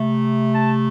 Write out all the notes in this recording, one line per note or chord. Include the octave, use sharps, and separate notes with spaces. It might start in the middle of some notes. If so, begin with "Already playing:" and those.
Already playing: C3 A3
A5